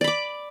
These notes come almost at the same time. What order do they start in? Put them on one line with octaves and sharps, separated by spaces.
D5 B5 D6